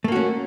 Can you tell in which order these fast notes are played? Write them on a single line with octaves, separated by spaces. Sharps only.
A3 A#3 F#4 C#4